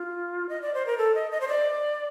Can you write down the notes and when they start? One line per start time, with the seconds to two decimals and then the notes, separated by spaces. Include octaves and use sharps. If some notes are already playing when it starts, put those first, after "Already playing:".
Already playing: F4
0.49 D#5
0.62 D5
0.74 C5
0.86 A#4
0.98 A4
1.15 D#5
1.31 D#5
1.41 C5
1.48 D5